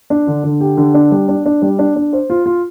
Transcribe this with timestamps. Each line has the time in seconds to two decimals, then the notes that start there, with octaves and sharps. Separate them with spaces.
0.10 D4
0.27 D3
0.44 D3
0.61 G4
0.77 D3
0.94 D4
1.11 G3
1.29 D4
1.46 D4
1.62 G3
1.79 D4
1.96 D4
2.13 C5
2.30 F4
2.46 F4